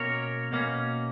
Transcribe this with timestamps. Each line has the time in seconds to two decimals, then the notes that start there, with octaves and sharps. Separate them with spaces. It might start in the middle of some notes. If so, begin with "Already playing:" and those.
Already playing: B2 A#3 C#4 A#4 C#5
0.52 B2 A#3 C#4